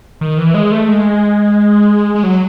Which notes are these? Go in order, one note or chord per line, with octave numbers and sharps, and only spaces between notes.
D#3
E3
G#3
A3
G#3
G#3
F#3